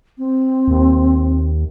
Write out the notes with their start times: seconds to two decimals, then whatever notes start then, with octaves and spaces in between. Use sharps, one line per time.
0.18 C4
0.68 D#2